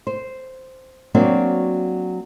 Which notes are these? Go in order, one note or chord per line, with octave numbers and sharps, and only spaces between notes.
C5
F#3 A#3 C4 D4 F#4